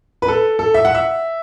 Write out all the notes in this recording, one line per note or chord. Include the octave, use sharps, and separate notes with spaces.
B4
A4
A4
E5
F#5
E5